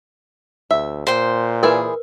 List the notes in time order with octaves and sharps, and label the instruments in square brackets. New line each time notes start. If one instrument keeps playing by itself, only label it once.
[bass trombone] D2 [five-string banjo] E5
[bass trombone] A#2 [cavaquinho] C5 G5
[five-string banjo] E3 G#4 D5 [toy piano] A#4 B4